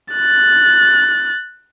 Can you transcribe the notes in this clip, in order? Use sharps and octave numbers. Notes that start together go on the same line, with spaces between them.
F#6 A6